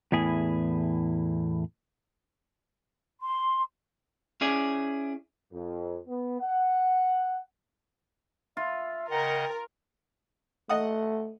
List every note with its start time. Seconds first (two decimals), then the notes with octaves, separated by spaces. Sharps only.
0.12 E2 A2 E4 G#4
3.22 C6
4.41 C#4 E4 G#4 D5
5.52 F2
6.07 B3
6.40 F#5
8.57 F4 E5
9.10 C#3 A#4 D#5 F#5 G5
10.69 A3 D#5 F#5 D#6